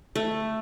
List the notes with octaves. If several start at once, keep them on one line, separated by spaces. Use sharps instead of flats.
A3